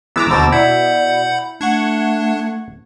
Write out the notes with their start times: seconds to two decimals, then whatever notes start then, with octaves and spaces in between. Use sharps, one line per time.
0.16 E3 G#3 B3 A#5 D6 E6
0.31 D#2 B2 D3 C5 A6
0.52 B2 E4 D5 F#5 B5 G6
1.61 A3 D4 F#5 C#6 G#6